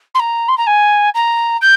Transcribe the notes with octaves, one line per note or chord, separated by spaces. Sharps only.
C6
A#5
C6
A#5
G#5
A#5
G6